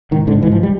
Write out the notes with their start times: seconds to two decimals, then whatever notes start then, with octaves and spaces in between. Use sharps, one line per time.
0.11 G#2 D#3
0.27 G#2 D3
0.42 G#2 E3
0.52 F3
0.63 G3